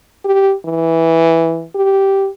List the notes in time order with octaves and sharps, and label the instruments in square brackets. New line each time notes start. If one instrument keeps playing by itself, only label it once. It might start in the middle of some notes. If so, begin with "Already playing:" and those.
[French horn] G4
E3
G4